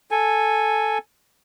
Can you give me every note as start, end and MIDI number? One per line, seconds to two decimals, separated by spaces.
0.11 0.98 69
0.11 0.98 80